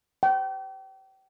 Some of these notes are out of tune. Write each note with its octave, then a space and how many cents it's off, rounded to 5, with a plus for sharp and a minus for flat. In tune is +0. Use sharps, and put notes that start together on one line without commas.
G5 -35